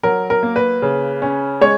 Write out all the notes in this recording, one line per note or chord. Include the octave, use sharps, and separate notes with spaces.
F#3 A#4
A#4
A#3
B4
C#3
C#4
G#3 C#5